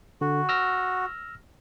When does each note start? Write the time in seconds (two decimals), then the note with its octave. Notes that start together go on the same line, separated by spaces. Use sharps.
0.21 D3 F#4
0.49 E6 F6 A#6